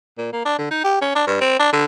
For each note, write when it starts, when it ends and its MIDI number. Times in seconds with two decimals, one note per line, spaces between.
0.18 0.29 46
0.33 0.45 58
0.45 0.55 62
0.59 0.68 50
0.71 0.82 63
0.84 0.97 67
1.02 1.12 61
1.15 1.23 62
1.27 1.40 43
1.41 1.57 60
1.60 1.70 62
1.73 1.85 50